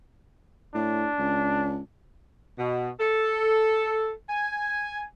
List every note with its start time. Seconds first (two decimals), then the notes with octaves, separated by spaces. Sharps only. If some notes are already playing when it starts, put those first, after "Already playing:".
0.75 A2 D4
1.19 C#2
2.59 B2
3.00 A4
4.30 G#5